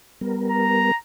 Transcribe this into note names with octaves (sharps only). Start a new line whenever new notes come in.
G3 B3 A#4
A#5